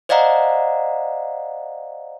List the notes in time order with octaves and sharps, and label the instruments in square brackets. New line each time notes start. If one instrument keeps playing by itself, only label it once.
[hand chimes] C5 D5 D#5 F5 F#5 A#5